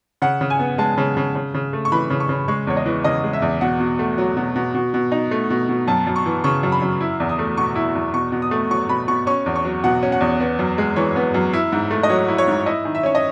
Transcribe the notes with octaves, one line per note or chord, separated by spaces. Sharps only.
C#3 F#5
C#3
G#5
B3
G#3 A5
C#3
C#3
C#3
C#3
A3
C#6
E3 B5
C#3
C#6
C#3
G#3 C#6
E2 C#5
D#5
E3
C#3 D#5
G#3
E5
E2
B2 F#5
B2
A3
F#3
B2
B2
B2
B2
D#4
A3
B2
B2
F#2 A5
F#2
C#6
E3
C#3 C#6
F#2
B5
F#2
E4
E2
D#6
A3
B2 C#6
E4
E2
B2 C#6
B2
D#6
A3
F#3 C#6
B2 B5
B2 C#6
C#4 C#6
E2
C#6
F#3
B2 F#5
C#4
F#5
E2
B3
F#2
G#3
E3 C#5
B3
F#2
E4
G#2
A3
D#5
F#3 C#5
E4
C#5
G#2
E4 D#5
D#3
E5
C#4 C#5
D#5